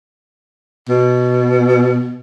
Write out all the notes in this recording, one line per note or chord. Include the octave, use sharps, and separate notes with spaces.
B2